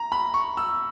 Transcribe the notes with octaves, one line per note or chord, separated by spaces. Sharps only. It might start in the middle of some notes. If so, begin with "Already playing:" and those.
Already playing: A#5
B5
C#6
E6